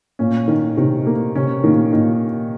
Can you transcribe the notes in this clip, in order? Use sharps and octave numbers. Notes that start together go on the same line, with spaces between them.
A#2 C#4
D#3
C3 D#3
A#3
C3 C#4
A#2 D#3
A#2 D#3